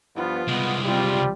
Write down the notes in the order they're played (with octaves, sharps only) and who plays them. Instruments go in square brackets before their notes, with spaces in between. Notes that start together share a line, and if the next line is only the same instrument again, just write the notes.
[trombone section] G2 F3 B3 [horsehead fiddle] F4
[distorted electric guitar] C2 G#3 [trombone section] B3
[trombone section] G3 [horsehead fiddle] C4 F4